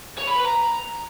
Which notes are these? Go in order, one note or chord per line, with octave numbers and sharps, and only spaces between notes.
C#5
B5
B4
A#5